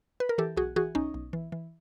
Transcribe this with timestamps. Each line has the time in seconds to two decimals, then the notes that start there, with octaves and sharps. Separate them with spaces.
0.20 B4
0.29 A#4
0.38 E3 G4 A4
0.57 B1 F#4 G#4
0.76 E3 F#4 G#4
0.95 B1 C#4 D#4
1.14 B1
1.33 E3
1.52 E3